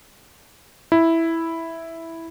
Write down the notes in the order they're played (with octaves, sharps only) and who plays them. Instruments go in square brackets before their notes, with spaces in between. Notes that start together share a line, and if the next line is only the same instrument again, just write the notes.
[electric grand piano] E4